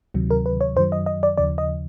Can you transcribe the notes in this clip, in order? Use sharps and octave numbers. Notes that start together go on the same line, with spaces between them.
D2 C3 D#3 F#3
A#4
B4
C#5
F#2 D#3 F#3 C5
D#5
D#5
D5
D#2 C#3 F3 D5
D#5